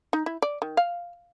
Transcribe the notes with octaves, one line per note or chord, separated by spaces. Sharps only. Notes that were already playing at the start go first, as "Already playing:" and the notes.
D#4
E4
D5
D#3
F5